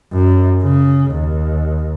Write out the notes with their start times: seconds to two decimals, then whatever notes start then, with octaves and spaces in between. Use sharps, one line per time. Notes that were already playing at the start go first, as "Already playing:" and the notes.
0.13 F#2
0.64 C#3
1.12 D#2